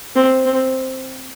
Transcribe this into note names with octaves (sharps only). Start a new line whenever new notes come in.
C4
C4